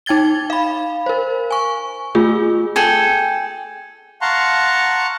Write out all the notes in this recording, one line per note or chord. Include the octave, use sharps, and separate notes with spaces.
D#4 G5 G#6 A6 G7
F5 B5
A#4 C5
G#5 C#6
A3 F4 G#4
G#4 A4 G5
F5 F#5 A5 A#5 C6 C#6